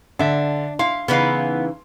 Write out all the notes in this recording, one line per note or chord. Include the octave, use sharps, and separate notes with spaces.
D3 D4 E5
E4 F5 C6
C#3 E3 B3 D#4 B4 F5